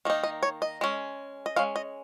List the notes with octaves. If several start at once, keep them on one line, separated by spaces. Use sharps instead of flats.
D#3 A#3 D#4
D#5
C#5
D#5
G#3 C#4
D#5
G#3 C#4 F5
D#5